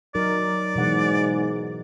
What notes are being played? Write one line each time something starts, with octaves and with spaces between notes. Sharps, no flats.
F#3 D#4 A#4 D5
G#2 B2 E3 F#5